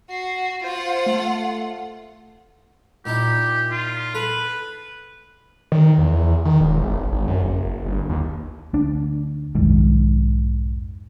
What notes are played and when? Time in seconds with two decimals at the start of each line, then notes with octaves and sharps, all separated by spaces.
0.10 F#4 C7
0.64 F4 C5 F#5
1.06 A3
3.06 A#2 D#4 E4 G4
3.71 F4
4.15 A4 B4
5.72 D#3
5.98 E2
6.45 D#3
6.61 E1
6.83 G#1
7.12 G#1
7.28 F#2
7.44 F#1
7.86 G1
8.10 D#2
8.73 D2 D4
9.55 B1 F2 G#2 D#3